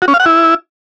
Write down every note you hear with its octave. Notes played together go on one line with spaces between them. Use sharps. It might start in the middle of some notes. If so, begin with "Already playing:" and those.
F#4
C#4
F5
F#5
E4